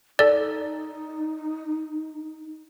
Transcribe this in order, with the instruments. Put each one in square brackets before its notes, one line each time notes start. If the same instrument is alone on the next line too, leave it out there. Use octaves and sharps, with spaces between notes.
[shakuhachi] D#4 [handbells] A4 D5